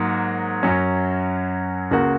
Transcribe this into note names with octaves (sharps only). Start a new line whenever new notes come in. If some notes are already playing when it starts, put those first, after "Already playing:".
Already playing: G#2 F#3 A#3
F#2 F#3 C#4
C#2 C#3 A#3 F#4